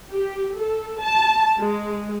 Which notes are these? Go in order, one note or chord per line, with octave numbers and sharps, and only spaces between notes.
G4
A4
A5
G#3